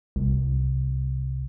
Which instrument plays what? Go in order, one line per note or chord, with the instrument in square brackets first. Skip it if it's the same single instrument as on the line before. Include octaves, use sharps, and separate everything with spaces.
[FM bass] C2